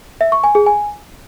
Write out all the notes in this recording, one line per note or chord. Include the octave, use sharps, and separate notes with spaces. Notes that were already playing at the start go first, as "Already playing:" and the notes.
E5
C#6
G#5
G#4
G#5